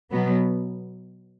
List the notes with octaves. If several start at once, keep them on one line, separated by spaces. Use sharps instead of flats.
B2 F#3 B3